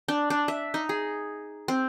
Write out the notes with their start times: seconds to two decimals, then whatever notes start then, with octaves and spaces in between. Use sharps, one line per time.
0.08 D4
0.30 D4
0.48 E5
0.74 D#4
0.89 G#4
1.68 C4